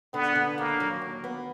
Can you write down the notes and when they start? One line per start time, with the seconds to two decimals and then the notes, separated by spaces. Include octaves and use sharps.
0.14 D3 B3
0.35 D3
0.57 D#2 A#3
0.80 F#3
1.02 D#2
1.24 B3